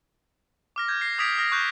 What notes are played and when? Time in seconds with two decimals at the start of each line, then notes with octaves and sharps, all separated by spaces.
0.76 D6 F6 A#6
0.88 G6 G#6
1.01 A#6 C7
1.18 D6 D#6 G#6 B6 D7 F7
1.38 D#6 F6 A#6
1.52 C#6 F#6 G6